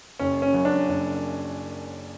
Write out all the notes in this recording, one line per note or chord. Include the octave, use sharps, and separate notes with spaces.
F#1 C#4
C#4
F#2
D4
F#1